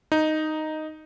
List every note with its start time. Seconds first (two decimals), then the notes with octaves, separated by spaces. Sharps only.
0.12 D#4